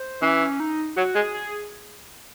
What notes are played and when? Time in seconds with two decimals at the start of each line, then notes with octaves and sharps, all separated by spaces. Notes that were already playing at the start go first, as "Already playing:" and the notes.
Already playing: C5
0.22 E3 C#4
0.41 C#4
0.60 D#4
0.96 F#3 F#4
1.15 G#3 G#4
1.34 G#4